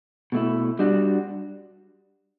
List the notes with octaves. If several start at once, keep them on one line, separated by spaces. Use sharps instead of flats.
B2 A3 E4
G3 D4 F#4